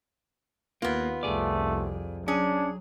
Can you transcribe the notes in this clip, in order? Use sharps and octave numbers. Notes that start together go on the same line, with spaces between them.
D#2 A#3 B3 F4
C2 F2 A3 G#4 D5
F#3 C#4 D4 G#4